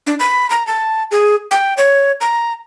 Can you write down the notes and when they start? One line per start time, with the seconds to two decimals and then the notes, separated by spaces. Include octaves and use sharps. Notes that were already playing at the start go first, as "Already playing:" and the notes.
0.07 D4
0.19 B5
0.50 A#5
0.67 A5
1.11 G#4
1.51 G5
1.77 C#5
2.21 A#5